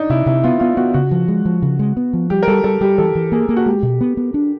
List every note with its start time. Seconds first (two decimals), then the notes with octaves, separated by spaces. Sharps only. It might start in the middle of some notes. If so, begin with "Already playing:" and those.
Already playing: D4 D#4
0.10 C3 E4
0.26 C3 E4
0.44 B3 F4
0.60 B3 F4
0.77 B3 F#4
0.94 C#3 F#4
1.11 F3
1.28 G#3
1.45 F3
1.62 C#3
1.79 G#3
1.97 B3
2.13 F3
2.30 G3 G4
2.43 A#4
2.47 G3 A4
2.64 G3 A4
2.81 G3 G4
2.98 E3 A4
3.15 E3
3.32 A#3 G#4
3.49 A#3
3.56 F#4
3.66 G#3 G4
3.83 B2
4.01 B3
4.17 B3
4.34 D4